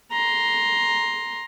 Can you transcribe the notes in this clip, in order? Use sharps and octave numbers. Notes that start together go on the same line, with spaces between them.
A#5 C6